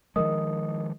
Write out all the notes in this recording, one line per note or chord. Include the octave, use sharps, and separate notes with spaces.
D#3 F3 G#3 A#4 D#5 D#6